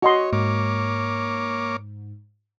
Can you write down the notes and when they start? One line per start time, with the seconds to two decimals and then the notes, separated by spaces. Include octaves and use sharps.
0.03 F#4 C#5 D#5 C6
0.33 G#2 A#3 C#5 D6